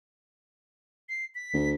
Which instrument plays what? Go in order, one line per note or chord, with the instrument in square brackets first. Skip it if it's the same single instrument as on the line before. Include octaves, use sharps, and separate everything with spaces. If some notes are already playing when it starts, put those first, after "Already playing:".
[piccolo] C7
B6
[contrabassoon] D2